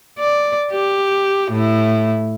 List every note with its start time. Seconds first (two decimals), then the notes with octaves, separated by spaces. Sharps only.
0.19 D5
0.72 G4
1.52 A2 E4